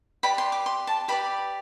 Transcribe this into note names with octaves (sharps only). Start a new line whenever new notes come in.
G4 B4 D5 B5
C6
D6
C6
A5
G4 B4 D5 B5